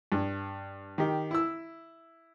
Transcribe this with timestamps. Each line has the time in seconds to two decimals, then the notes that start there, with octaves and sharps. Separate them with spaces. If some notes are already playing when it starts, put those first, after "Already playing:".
0.12 G2
0.98 D#3 G4
1.31 E4 E6